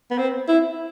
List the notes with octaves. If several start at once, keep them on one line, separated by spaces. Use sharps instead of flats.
B3
C4
E4